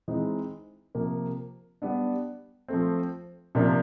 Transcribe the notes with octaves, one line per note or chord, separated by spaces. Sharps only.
E3 G#3 C4 D#4
C3 F3 A#3
G3 B3 D4
F3 A3 C4
C3 F3 A#3 D4